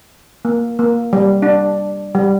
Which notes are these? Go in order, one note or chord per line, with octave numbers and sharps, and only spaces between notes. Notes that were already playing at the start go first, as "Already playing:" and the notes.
A#3
A#3
G3
D4
G3